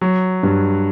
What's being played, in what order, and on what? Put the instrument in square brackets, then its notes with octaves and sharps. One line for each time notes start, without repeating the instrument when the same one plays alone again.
[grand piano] F#3
G2